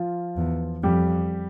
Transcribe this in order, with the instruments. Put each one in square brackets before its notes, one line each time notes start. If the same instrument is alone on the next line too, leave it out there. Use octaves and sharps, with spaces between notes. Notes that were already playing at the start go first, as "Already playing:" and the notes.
Already playing: [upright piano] F3 F4
[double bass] E2
[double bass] F2 [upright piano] G3 G4